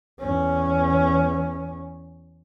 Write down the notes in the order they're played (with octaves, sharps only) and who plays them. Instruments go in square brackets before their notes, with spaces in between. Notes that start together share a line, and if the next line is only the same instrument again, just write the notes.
[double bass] E2 C#4